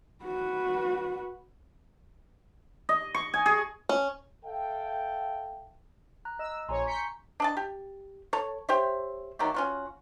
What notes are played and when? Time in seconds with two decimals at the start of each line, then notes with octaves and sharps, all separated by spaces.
0.25 F#4 B4
2.89 D#5
3.14 C#6
3.34 G#5
3.46 G#4
3.89 C#4
4.46 A4 E5 F5 G5
6.25 A#5 F#6
6.39 D#5 E6
6.68 A#1 C#5 G#5 A#5 C6
6.86 A#5 C#6 G6 B6 C#7
7.40 D4 D#5 A5
7.57 G4
8.33 A4 C#5
8.69 G4 C5 C#5 E5
9.39 D#3 F#3 A3 G4
9.54 C#4 F4 F#4